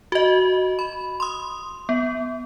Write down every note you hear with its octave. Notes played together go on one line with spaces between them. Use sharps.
F#4 D#5
B5
C6 D#6
B3